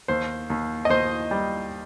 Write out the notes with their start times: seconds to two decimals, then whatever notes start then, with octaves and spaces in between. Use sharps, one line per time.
0.08 D#2 C5
0.50 D#2
0.85 D#5
0.89 D#2 C5
1.31 G3